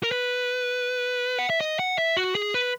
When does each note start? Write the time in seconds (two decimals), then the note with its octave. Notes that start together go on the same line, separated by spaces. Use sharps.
0.03 A#4
0.12 B4
1.39 F#5
1.50 E5
1.61 D#5
1.79 F#5
1.98 E5
2.17 F#4
2.35 G#4
2.54 B4